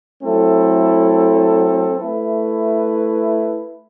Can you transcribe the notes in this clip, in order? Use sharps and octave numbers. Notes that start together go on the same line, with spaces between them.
F#3 A3 C4 E4 A4
A3 E4 B4